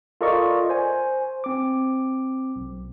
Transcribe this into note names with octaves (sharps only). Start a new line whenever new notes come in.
F4 A4 A#4 D5 D#5 C#6
C5 G#5
C4 D6
B1